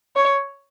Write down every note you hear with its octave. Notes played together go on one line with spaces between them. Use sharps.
C#5